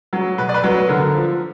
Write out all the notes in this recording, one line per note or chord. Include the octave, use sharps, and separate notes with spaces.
F#3
B2 B4
D5
B4
F#3
B4
D3 A#4
F3